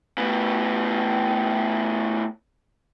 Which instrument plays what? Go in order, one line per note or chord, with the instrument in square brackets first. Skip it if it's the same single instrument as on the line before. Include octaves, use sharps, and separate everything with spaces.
[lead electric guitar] A2 B3